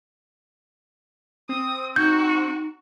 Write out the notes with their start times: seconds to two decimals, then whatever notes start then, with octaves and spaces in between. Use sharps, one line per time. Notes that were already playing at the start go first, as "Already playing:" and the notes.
1.49 C4 D#6
1.96 D#4 F#4 G6